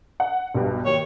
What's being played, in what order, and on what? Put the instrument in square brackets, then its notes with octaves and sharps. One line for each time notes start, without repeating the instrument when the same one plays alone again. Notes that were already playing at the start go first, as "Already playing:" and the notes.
[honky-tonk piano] F#5
B1 G2
[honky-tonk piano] D#2 [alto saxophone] C#5